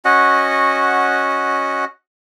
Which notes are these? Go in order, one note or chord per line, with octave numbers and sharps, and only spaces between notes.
C#4 F#4 D#5 F#5